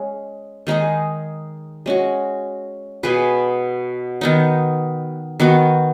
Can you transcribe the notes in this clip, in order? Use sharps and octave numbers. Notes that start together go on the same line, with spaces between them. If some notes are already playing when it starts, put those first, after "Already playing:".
Already playing: G#3 C#4
D#3 G#3 D#4 G#4
G#3 C#4 F#4
B2 B3 G#4 B4
D#3 B3 D#4
D#3 B3 F#4